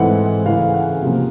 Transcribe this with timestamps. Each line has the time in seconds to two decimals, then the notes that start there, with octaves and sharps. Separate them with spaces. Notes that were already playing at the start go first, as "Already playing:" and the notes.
Already playing: G#2 E3 A3 C4 E4 F#5
0.46 C#3 E3 A3 C#4 E4 F5
0.74 F#5
1.02 C3 F3 A#3